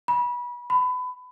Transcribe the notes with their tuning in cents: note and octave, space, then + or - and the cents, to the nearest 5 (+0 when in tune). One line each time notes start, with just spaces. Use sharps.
B5 -25
B5 +25